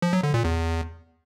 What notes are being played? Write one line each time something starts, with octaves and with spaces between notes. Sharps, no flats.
F3
F#3
D3
A#2
E2